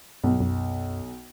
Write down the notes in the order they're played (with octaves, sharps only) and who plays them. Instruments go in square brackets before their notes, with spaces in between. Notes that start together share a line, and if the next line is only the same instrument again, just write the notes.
[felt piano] B1 [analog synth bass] G2
[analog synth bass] F#2